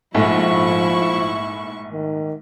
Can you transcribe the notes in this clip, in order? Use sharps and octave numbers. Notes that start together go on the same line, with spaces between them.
A#1 G#2 F3 A3 E4 C#6
D#3